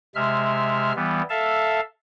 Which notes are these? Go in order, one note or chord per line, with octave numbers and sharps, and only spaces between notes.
C3 G#3 E5 F6
E3 G3 B3
A4 E5 F5 A5